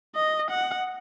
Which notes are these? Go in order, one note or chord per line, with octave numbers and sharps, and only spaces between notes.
D#5
F#5